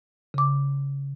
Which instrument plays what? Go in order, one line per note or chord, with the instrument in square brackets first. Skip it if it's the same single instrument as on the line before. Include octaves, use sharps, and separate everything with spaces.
[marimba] C#3 D6